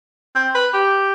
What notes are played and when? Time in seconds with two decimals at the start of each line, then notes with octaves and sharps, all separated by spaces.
0.35 C4
0.55 B4
0.74 G4